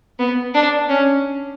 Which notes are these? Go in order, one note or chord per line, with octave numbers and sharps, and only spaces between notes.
B3
D4
C#4